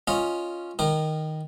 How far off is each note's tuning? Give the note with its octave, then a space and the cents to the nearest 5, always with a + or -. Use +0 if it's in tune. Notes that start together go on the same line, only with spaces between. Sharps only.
C#4 +0 F4 +0 D#5 +0
D#3 +0 A#4 +0 D#6 -30